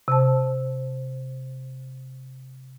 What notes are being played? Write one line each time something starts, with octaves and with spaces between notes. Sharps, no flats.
C3 C5 A5